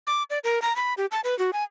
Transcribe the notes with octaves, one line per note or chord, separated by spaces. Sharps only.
D6
D5
A#4
A#5
B5
G4
A5
B4
F#4
G#5